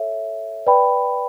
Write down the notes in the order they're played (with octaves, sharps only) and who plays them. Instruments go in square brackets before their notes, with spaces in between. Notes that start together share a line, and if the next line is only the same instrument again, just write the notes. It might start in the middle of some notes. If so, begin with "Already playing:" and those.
Already playing: [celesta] A4 C#5 E5
B4 D5 G5 B5